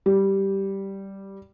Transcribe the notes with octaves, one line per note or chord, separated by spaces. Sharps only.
G3